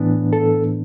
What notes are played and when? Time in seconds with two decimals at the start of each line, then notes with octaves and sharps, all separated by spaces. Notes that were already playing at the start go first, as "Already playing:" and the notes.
Already playing: A2 E3 B3 D4
0.33 A4